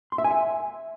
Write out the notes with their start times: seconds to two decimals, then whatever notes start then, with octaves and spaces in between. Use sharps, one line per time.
0.12 C6
0.18 E5
0.24 G#5
0.31 E5